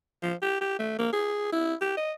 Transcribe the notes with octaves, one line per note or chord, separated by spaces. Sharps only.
F3
G4
G4
A3
A#3
G#4
E4
G4
D#5